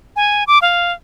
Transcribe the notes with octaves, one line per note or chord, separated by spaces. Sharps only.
G#5
D6
F5